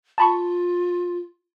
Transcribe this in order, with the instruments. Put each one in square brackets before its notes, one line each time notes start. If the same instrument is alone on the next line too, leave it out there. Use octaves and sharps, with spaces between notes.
[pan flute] F4 [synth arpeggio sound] A5 B5 C#6